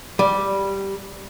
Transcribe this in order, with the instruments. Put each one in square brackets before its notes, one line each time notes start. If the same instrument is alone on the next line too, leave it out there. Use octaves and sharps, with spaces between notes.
[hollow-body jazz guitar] G3